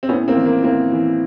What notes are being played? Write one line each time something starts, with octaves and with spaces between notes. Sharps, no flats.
C4
A2 B3 C#4
A#3 C4
E3
A#3
A2 A#3 C4
E3